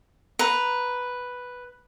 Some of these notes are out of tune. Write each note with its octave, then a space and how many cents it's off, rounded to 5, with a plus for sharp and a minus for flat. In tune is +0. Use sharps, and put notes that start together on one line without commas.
B4 +0 A#5 +0